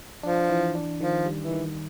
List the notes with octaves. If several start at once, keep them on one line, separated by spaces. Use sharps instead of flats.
F3 D4
E3
D4
D#3 F3
G3
E3
D#3